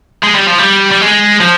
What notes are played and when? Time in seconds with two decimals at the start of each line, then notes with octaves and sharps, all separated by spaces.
0.24 G#3
0.35 G3
0.47 F3
0.59 G3
0.91 G3
1.01 G#3
1.40 F3